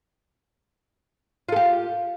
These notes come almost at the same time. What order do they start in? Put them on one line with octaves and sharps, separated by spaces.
F4 A4 G4